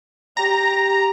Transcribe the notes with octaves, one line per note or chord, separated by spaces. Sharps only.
G4 A#5